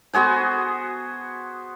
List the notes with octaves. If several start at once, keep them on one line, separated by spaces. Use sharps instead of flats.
B3 F#4 G#4 C5